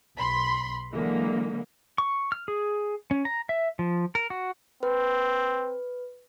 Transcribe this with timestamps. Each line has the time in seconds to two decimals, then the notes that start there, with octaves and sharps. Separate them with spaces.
0.17 B1 B5 C6
0.93 D3 E3 F#3 G#3 A#3
1.98 C#6
2.32 F6
2.48 G#4
3.11 C#4
3.25 A#5
3.49 E5
3.79 F3
4.15 A#4
4.30 F#4
4.83 C4 B4